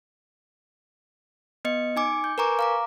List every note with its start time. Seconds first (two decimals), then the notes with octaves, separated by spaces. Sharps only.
1.65 B3 D#5 C#7
1.96 D#4 G#5 D6 C#7
2.24 G6
2.38 A#4 B4 G#5 A#5 C#6 D6
2.59 F5 A#5 D6